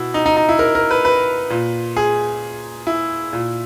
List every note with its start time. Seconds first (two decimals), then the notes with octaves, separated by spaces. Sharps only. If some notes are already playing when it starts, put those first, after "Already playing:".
Already playing: B2 E4
0.14 D#4
0.26 D#4
0.37 D#4
0.49 E4
0.59 A#4
0.75 A#4
0.91 B4
1.05 B4
1.50 A#2
1.97 G#4
2.87 E4
3.33 A#2